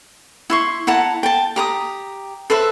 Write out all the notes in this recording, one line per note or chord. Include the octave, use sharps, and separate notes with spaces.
E4 C6 C#6
E4 F#5 A5 A#5
G5 A5
G4 A#5 D#6
A4 B4 C5 E5